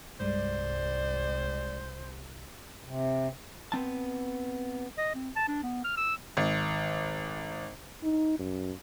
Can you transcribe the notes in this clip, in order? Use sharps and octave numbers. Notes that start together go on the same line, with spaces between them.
C2 G2 G3 G#3 C5 D5
C3
B3 C4 A5
D#5
C4
A5
D4
B3
F6
E6
G#1
D#4
F#2